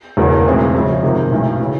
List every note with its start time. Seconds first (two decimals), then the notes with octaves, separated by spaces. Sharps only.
0.17 E1 E2 C#3 F#3 A#3
0.46 B1 A2 E3 G#3 C4
0.74 F#2 C#3 F3
1.03 C3 D#3 G#3
1.32 B1 A2 E3 A3
1.60 C#3 E3